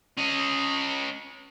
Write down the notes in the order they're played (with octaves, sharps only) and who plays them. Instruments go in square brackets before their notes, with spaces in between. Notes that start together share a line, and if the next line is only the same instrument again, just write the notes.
[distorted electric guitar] C#4 D#5